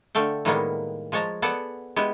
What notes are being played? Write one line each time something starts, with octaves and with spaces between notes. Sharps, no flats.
D3 A3 F5 G5
A2 D#3 G3 G#3 A#3 B3
F3 G#3 C#5 A5 A#5
B3 G#4 A4 D5 F#5
G#3 B3 E4 G4